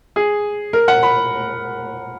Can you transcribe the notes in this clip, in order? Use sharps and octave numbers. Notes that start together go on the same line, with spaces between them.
G#4
A#4
F#5
B5